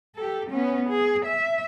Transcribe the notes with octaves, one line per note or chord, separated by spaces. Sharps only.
G4 A4
B3 C#4
G#4
E5